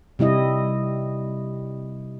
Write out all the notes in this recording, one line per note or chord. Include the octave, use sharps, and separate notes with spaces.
C3 G3 E4 D#5